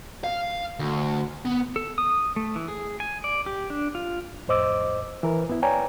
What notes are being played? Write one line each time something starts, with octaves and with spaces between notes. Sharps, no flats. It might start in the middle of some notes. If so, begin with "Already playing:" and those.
F5
D2
B3
A4
D#6
A3
E3
G#4
G#5
D5
G4
D4
F4
F2 A2 C5 D#5 D6 E6
E3 A#4 B4
G#2 B3 E4
B4 C#5 D5 G5 G#5 A#5